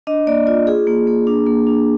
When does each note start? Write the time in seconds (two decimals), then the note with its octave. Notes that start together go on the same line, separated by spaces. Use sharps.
0.07 D4 D#5
0.27 A#3 D5
0.47 F4 D5
0.67 F4 G#4
0.87 A#3
1.07 A#3
1.27 D4
1.46 A#3
1.67 D4